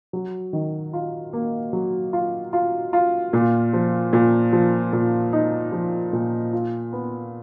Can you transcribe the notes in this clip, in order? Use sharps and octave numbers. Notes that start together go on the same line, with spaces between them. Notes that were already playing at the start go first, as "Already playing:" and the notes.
F#3
D#3
F4
A#3
F#3
F4
F4
F4
A#2
F3
A#2
F3
A#2
D#4
F3
A#2
F4
B3